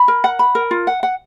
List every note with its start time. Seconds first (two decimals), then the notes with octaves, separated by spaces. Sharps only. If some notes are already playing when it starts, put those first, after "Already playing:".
Already playing: B5
0.08 A#4
0.24 F#5
0.39 B5
0.55 A#4
0.71 F4
0.87 F#5
1.03 F#5